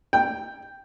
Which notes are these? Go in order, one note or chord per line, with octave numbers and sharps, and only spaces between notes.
G5